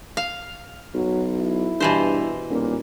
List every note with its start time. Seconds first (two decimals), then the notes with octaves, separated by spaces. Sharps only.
0.17 F5
0.94 B1 F#3
1.37 E4
1.80 G2 B2 E3 C5
2.51 D#1 A#2